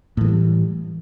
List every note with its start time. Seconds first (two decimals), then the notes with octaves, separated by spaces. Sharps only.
0.17 A2
0.21 E3
0.25 A3
0.28 G3